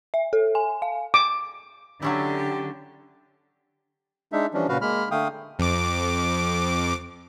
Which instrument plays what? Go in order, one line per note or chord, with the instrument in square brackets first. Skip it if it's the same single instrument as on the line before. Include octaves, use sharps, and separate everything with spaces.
[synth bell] E5
A4
G#5
F5
[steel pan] D6
[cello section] D3 [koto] F#3 C#4 E4 [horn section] G4
[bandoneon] G#3 D4 D#4 E5
E3 F3 G3 C#4 D4
A#2 C#3 F#4 B4 F5
G#3 A#3 B5 F6
D3 A3 F5 G5 D#6
[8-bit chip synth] F2 D6